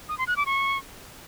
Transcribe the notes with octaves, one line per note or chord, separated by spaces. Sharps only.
D#6
C6
F#6
D6
C#6